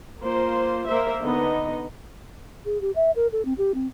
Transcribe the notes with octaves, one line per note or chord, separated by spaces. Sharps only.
A#3 F4 C5
A#3 A#4 C5 E5
D3 B3 D#4 D#5
G#4
G4
E5
A#4
A4
C4
G4
C4